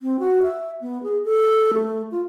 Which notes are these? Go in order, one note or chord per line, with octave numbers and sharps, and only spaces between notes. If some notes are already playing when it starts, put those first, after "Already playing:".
C4
F#4
E5
B3
G#4
A4
A3
F4